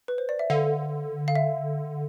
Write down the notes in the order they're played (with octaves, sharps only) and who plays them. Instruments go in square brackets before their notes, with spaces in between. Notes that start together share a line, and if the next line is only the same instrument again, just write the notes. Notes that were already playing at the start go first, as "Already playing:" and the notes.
[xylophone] B4
C5
D5
E5
[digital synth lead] D3 [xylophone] F5
[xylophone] F5
E5